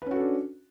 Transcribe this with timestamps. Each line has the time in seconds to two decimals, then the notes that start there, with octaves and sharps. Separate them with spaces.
0.02 B4
0.06 C#4
0.11 F#4
0.15 A4
0.20 D4